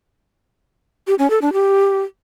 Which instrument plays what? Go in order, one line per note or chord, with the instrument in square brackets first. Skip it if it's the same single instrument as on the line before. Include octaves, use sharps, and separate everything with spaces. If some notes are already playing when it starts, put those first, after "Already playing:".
[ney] G4
C#4
A4
D4
G4